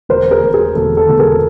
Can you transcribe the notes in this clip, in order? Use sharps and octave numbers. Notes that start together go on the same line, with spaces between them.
E1 A#4 C5
G#4 A#4
E1
G#4
E1 A4
A4
E1
G#4 A#4